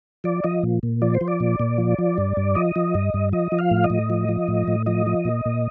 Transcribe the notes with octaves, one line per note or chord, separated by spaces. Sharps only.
F3 D5
F3 D#5
A#2
A#2
F3 D5
C5
F3
D5
A#2
A#2
F3
F3
G2
G2
F3 D#5
F3
G2
G2
F3 D#5
F3
F5
A2
D#5
A2
F3
F3
A2
A2
F3 D#5
F3
A#2
A#2